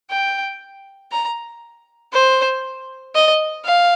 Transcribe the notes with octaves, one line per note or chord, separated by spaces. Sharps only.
G5
A#5
C5
D#5
F5